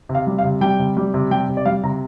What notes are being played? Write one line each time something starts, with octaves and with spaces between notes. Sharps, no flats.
C3
F5
G3
F5
C3
G3 G5
C3
G3
C3
G3 G5
C3
D5
G3 F5
C3 A#5